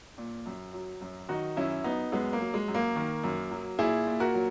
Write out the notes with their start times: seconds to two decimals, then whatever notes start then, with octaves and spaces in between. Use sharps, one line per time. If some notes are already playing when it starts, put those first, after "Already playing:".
0.18 A#2
0.46 F#2
0.73 F#3
1.01 F#2
1.29 D#3 D#4 F#4
1.57 F#2 C#4 E4
1.84 F#3 B3 D#4
2.12 F#2 G#3 B3
2.33 A#3
2.40 F#3
2.54 G#3
2.68 F#2
2.75 A#3
2.96 D#3
3.24 F#2
3.51 F#3
3.79 A#2 E4 G#4
4.07 A#2
4.20 F#4 A#4
4.34 F#3